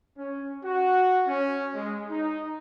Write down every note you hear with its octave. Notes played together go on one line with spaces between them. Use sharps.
C#4
F#4
C#4
G#3
D#4